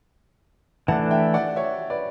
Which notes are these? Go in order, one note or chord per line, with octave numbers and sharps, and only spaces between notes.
E3 A3 D4 F#5 A5
E5 G5
D5 F#5
C#5 E5
B4 D5